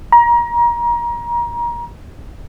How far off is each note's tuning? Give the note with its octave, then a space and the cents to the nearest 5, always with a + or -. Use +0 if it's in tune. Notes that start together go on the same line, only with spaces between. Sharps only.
A#5 +30